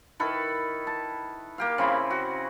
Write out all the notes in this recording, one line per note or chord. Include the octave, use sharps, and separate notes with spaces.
D#3 E4 A4 B4
A5
A#3 G4 F5
C#3 C4 E4 B5
F#4